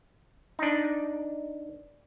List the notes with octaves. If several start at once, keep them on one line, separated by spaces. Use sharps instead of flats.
D4 D#4